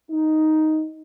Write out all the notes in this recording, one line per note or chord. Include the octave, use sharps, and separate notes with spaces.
D#4